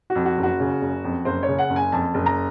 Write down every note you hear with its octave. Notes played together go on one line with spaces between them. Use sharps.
F#4
F2
F#4
F#1
F#4
C#3
F#1
F2
F#1 C5
C#5
C#3
F#5
F#1
G#5
F2 A5
F#1
A#5